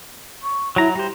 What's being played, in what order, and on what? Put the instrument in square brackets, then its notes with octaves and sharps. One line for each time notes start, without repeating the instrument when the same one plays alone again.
[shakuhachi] C#6
[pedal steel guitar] F#3 A#5 [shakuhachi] E4
[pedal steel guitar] G3 C5 [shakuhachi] G4